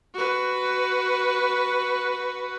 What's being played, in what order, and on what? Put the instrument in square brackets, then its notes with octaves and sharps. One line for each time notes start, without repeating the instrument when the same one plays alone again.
[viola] F#4 B4